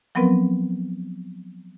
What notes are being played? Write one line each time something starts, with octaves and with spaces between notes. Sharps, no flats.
F3 F#3 B3 C4 A#4 B4